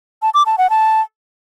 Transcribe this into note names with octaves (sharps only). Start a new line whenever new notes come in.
A5
D6
A5
F#5
A5